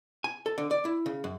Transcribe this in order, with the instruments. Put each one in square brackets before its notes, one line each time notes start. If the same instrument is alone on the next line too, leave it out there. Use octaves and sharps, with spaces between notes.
[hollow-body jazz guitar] G#5
A4
D3
D5
E4
C#3
F#2